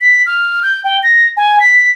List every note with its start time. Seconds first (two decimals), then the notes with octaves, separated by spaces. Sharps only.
0.01 B6
0.26 F6
0.63 G6
0.84 G5
1.03 A#6
1.37 G#5
1.60 B6